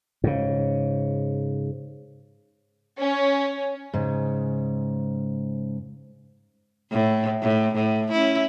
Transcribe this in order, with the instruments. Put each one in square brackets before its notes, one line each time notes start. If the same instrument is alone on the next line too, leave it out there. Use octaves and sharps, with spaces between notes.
[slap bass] G#2 C#3
[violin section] C#4
[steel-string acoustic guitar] G#2 C#3
[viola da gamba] A2
A2
A2
C#4 E4